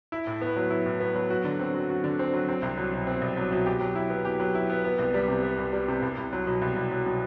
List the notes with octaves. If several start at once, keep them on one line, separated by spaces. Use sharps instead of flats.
E4
A2
B3
F#3
E4
A2
B3
F#3
F#4
D3
C4
F#3
F#4
D3
C4
F#3
C4
C2
F#3
B2
C4
C2
F#3
B2
G4
F#3
E4
B3
G4
F#3
E4
B3
B3
C2
G3
C3
B3
C2
G3
C3
C2
C2
F#3
B2
C2
C2
F#3
B2